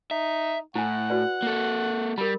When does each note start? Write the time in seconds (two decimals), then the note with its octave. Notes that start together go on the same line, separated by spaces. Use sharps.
0.11 D#4 E5
0.76 A2 E4 F#5 G#5
1.10 F#4 B4 D5
1.42 A#3 A4
2.18 G3 A#4 B5